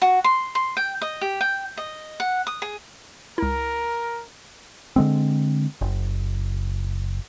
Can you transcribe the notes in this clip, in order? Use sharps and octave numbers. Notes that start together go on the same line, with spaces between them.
F#4
C6
C6
G5
D#5
G4
G5
D#5
F#5
D#6
G#4
C#2 E4 A#4
D3 G#3 C4
F#1